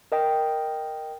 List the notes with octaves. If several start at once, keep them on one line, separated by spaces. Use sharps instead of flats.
A#4 D#5 G5